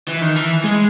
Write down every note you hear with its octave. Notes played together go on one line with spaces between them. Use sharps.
E3
D#3
E3
G#3